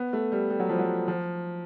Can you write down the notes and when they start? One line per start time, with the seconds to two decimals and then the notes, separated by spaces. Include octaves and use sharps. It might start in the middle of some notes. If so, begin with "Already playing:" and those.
Already playing: B3
0.13 A3
0.32 G3
0.50 G3
0.60 F#3
0.69 F3
0.79 F#3
1.08 F3